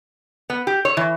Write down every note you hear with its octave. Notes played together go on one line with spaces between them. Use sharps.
B3
G4
C#5
E3